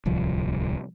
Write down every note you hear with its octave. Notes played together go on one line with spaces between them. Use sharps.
D1 C2 F3